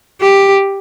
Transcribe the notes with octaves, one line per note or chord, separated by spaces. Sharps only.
G4